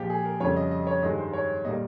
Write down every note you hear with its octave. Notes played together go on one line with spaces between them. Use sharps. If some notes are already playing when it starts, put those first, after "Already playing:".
Already playing: A#2 F3 G#3 G4
G#4
A#4
F2 C#3 G3 C#5
D#5
D#5
C#5
G2 D#3 G#3 D#5
C5
C#5
A#2 G3 A#3 D#5